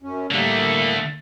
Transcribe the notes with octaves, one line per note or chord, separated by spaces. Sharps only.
F#2 C#4
A2 D3 G3 A3 A#3